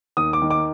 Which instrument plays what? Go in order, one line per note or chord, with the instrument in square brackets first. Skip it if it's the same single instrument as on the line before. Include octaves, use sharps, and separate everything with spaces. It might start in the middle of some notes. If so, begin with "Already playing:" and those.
[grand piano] D#2 D#6
D6
D#3
D6